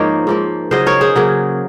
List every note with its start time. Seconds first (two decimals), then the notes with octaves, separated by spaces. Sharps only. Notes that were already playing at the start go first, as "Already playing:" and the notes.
Already playing: G#2 F3 A#3 D#4 A#4 C#5
0.27 G#2 F3 A#3
0.71 C#3 F#3 A#3 C5 D#5
0.86 A#4 C#5
1.01 G#4 C5
1.16 C#3 F#3 A#3